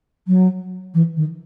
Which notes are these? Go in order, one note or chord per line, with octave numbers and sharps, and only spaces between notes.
F#3
E3
D#3